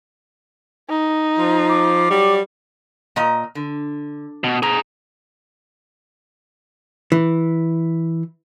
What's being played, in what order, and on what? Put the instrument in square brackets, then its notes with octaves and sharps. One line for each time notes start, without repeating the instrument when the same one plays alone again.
[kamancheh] D#4
[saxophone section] F3
[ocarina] D6
[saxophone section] F#3 G3
[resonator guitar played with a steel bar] A#2 D#5 A#5
D3
[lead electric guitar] B2
[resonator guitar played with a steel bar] B2 [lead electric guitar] G#4 A#5
[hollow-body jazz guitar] E3